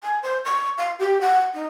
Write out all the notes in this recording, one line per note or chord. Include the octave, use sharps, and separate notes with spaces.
G#5
C5
C#6
F5
G4
F#5
D#4